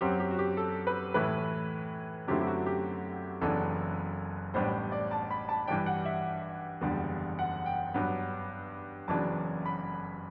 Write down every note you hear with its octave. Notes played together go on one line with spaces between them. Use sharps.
F#2 F#3 C4 G4
G4
F#4
G4
A4
B4
A2 E3 A3 E4 B4
F#2 D3 A3 C4 E4 G4
G4
F#4
G4
F#1 F#2 E3 B3 D4 A4
A1 A2 G3 B3 D4 C5
D5
A5
B5
A5
G2 E3 G3 D4 G5
F#5
E5
F#1 E2 D3 G3
F#5
G5
G2 F#3 B3
F#1 F#2 E3 B3 D4 A5
B5